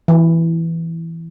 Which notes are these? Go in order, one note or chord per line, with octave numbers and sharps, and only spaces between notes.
E3